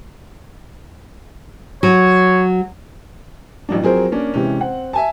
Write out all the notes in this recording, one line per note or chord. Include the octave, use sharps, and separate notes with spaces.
F#3 C#5
A1 F#3 D4
F3 F#3 C4 G#4 A#4 C5
A#3 C#4 D4
C3 E3 G#3 C#4
C4 F#5
E5 G#5 A5